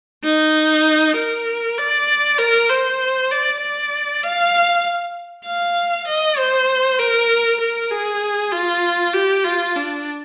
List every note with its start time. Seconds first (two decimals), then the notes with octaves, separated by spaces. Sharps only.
0.24 D#4
1.16 A#4
1.78 D5
2.39 A#4
2.69 C5
3.31 D5
3.61 D5
4.23 F5
5.45 F5
6.07 D#5
6.38 C5
6.99 A#4
7.60 A#4
7.91 G#4
8.52 F4
9.13 G4
9.44 F4
9.76 D4